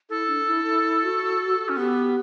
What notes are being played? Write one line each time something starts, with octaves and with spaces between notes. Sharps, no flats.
E4 A4
D4
E4
E4
E4
F#4
C#4
B3 G4